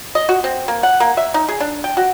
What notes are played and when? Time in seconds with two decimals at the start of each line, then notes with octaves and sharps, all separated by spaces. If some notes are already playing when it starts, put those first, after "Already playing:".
0.15 D#5
0.29 F#4
0.44 C4
0.68 A#3
0.83 F#5
1.00 A#3
1.17 E5
1.34 D#4
1.49 G#4
1.60 D4
1.84 G5
1.97 F#4